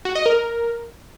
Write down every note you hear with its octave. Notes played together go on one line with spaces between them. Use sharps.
F#4
D#5
A#4